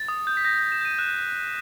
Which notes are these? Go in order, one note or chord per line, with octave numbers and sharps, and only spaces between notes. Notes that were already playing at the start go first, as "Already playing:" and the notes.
Already playing: A6
D#6
G6
B6
G6 A#6
G6 A#6
E7
G6 D#7
F#6 E7